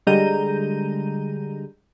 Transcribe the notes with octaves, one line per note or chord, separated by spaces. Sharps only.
D3 G3 G#3 A#5 G6 D#7